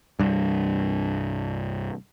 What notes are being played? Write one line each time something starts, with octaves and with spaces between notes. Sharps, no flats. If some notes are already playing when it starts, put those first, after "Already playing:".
C2 G2